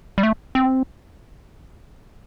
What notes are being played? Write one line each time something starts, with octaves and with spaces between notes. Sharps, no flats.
G3
A3
C4